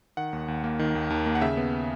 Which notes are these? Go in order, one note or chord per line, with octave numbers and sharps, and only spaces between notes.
D#3 F#5
D#2
D#2
A#3
D#3
D#2
D#2
A#3
F#5
C#3 E5
B3